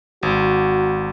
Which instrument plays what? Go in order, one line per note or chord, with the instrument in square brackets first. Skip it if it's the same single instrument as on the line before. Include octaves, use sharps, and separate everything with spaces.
[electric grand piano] G#1 [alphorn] F#4